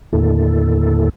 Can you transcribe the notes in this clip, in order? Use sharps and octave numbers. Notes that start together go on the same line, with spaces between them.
D#2 A2 D3 A#3 E4 A4